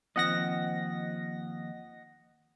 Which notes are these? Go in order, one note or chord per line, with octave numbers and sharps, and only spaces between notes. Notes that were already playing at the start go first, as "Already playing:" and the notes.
D#2 F3 C4 D#5 F#5 A#6